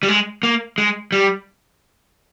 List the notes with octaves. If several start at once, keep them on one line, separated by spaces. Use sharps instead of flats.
G3
G#3
A#3
G#3
G3